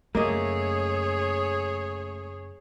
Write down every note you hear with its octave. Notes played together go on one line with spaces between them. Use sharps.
F#2 C#3 A3 A#3 G#4 C#5 D#5